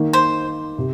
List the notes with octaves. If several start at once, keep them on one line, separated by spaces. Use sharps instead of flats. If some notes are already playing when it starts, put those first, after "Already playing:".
Already playing: D#3 A#3 D#4
C5
C3